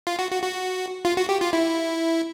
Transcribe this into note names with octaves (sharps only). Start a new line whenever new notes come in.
F4
F#4
F#4
F#4
F4
F#4
G4
F4
E4